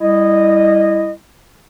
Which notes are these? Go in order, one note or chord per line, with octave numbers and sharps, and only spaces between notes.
G3 E4 D#5